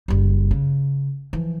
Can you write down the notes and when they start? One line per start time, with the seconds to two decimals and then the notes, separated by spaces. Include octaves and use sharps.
0.08 F#1 G3
0.51 C#3
1.33 E3 F3